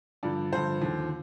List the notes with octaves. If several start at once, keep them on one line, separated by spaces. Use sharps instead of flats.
G2 D3 F3 D5
G2 D3 F3 C5
D#2 D3 F3